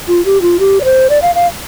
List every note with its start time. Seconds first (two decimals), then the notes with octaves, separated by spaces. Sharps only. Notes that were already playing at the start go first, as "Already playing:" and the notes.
0.08 F4
0.25 G4
0.42 F4
0.59 G4
0.81 D5
0.84 C5
1.10 D5
1.22 F5
1.35 F5